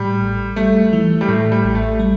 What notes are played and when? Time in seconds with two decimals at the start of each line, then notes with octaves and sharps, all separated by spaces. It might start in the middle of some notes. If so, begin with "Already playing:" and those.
Already playing: A2 G3
0.22 A1
0.56 G3 A3
0.93 E3
1.21 G3
1.28 A2 A3
1.52 G3
1.64 A1
1.75 A3
1.99 G3